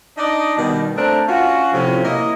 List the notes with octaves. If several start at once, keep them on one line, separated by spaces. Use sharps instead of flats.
D4 D#4 D5 D#5
B2 D#3 G3
A3 C4 D4 A#4
C#4 F4 F#4
A2 C3 F3 C4 C#4
A#3 E4 D#5